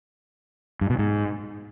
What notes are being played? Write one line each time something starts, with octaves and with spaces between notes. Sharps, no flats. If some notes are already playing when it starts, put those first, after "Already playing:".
G2
B2
G#2